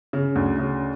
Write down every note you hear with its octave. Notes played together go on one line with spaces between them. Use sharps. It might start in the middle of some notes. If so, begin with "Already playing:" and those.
C#3
D2
C#3